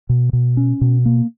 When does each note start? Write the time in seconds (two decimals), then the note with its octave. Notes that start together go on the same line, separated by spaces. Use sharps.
0.09 B2
0.33 B2
0.57 C#4
0.81 B2
1.05 A#3